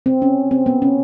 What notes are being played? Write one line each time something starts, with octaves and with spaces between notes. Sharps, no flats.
C4
C#4
C4
B3
C#4